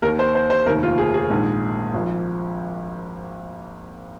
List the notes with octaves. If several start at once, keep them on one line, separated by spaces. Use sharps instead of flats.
D#2 D#3 A#4
C5
C5
C5
F1 D#2 D#3 A#4
F4
G#4
G#4
A#1 G#2 D#3
G#1 G#2 F3